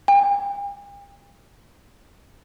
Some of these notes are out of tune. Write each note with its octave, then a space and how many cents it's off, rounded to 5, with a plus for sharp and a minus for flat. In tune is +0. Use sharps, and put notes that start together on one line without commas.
G5 +45